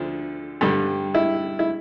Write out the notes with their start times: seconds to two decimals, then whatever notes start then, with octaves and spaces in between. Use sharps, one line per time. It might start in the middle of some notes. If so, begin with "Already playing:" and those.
Already playing: D2 D3 F3
0.61 G2 D3 G3
1.14 E4
1.59 E4